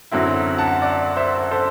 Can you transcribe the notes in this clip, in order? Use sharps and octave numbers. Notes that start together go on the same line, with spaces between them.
F#2 D3 F#3 C4 E4
F#5 A5
D5 F#5
C5 E5
A4 C5